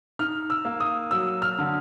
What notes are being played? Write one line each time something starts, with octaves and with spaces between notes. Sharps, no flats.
D#4 F6
E6
A#3
D#6
F#3 E6
F6
D3